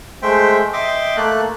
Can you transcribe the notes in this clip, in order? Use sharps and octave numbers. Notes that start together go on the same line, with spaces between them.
G#3 A3 C5 E5 G5
D#5 E5 G5 C6 D6
A3 A#3 A4 F#6